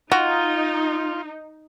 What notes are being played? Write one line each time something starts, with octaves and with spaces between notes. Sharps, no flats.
D#4 F4 F#4